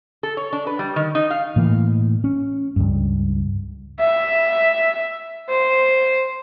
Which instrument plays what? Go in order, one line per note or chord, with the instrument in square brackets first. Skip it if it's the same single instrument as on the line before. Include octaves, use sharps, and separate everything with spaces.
[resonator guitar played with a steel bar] A4
C#5
D4
B4
G3
D#3
D#4
F5
[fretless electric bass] A2 E3 A#3
C#4
C#2 G2
[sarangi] E5
C5